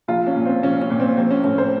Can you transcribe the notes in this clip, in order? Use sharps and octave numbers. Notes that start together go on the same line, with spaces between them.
A#1 F4
C#4
A#2
C4
A#1 C#4
C#4
A#2
C4
A#1 C4
C#4
A2 C#4
C5